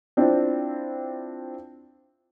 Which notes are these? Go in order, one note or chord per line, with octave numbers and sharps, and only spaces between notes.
C4 D4 E4 F4